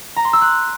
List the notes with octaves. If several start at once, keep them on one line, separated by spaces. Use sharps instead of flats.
A#5
C6
E6
F#6